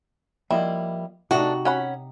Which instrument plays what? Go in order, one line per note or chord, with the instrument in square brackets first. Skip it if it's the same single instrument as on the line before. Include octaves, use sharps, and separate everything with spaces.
[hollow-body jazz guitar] F3 A#3 D#5 [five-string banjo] G3 E4
[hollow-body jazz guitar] C3 D#4 [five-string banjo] A3 D4 [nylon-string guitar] F#4
[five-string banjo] C#4 F#5 B5